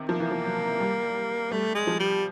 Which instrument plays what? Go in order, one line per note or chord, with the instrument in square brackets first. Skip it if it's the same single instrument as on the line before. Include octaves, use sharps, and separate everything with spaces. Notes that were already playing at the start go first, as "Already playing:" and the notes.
Already playing: [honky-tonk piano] C3 D#3
[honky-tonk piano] F3 [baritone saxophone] A#3
[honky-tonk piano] E3
F3
F#3
G3
[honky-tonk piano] G3 [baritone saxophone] A3
[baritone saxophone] G#3
[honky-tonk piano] F3
[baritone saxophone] G3